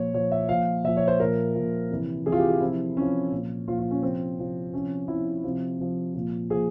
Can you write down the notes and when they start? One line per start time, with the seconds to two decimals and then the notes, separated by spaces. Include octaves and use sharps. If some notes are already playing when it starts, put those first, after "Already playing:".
Already playing: A#2 F3 C#5
0.14 A#2 F3 C#5
0.32 E5
0.49 A#2 F3 F5
0.84 A#2 E5
0.87 F3
0.97 C#5
1.08 C5
1.19 A#2 F3 A#4
1.54 A#2 F3
1.91 C3 E3
2.26 C3 E3 G#4
2.32 F4
2.38 G4
2.50 G4
2.61 C3 F3 E4
2.97 C3 F3 C#4
3.32 A#2 F3
3.68 A#2 F3 F4
3.79 F4
3.91 C#4
4.02 C3 F3 C4
4.38 C3 F3
4.73 C3 F3 C#4
5.08 C3 F3 E4
5.44 C3 F3
5.79 C3 F3
6.14 A#2 F3
6.50 A#2 F3 G#4